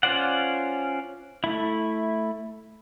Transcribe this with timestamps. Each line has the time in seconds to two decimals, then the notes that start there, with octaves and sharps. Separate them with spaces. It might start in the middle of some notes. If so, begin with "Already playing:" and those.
0.03 C#4 F4 C5 D5 F#5
1.44 A3 E4